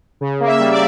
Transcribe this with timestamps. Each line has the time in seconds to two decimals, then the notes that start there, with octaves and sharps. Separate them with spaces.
0.21 C#3
0.40 A#3
0.47 E5
0.59 G3
0.71 D5